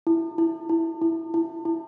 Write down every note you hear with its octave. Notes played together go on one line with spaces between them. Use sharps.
E4
E4
E4
E4
E4
E4